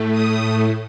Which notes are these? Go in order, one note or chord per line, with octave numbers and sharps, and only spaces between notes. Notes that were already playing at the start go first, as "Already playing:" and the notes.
Already playing: A2 A3
D#6